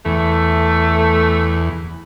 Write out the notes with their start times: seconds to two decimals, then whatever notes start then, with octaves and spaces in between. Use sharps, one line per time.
0.05 E2 A3